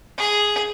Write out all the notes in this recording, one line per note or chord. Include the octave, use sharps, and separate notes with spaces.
G#4